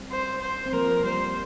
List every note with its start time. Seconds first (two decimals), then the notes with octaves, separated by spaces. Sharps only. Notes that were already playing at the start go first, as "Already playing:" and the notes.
Already playing: G3 C4
0.11 C5
0.42 C5
0.66 C4
0.73 F3 A#3 A#4
1.04 G3 C5